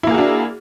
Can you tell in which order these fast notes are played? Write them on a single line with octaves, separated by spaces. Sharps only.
E4 A#3 G#4 F#4 D4